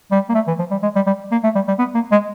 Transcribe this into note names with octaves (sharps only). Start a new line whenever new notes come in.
G3
A#3
A3
E3
F3
G3
G#3
G3
G3
A#3
A3
G3
G3
B3
A#3
G#3